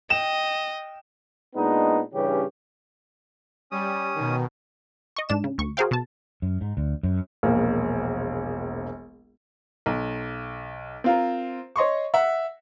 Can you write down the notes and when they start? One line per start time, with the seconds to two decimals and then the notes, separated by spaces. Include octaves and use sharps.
0.10 D#5 G5 E7
1.56 A#2 G#3 B3 D4 D#4
2.14 G2 C#3 E3 C#4 G4
3.71 G3 C#4 D#6
4.15 B2 D#3
5.16 D#5 C#6
5.29 G#2 D4 E7
5.44 C#3
5.58 D2 C#6
5.77 F#4 G#4 A#4 C5 F5 G5
5.91 B2 A5
6.42 F#2
6.61 G#2
6.77 D2
7.03 F#2
7.43 E1 A#1 A#3
9.86 B1
11.04 C4 F4 A#4
11.76 C#5 D#5 C6 C#6
12.14 E5 F#5